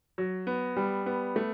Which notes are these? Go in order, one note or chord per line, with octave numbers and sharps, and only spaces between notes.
F#3
B3
G3
B3
A3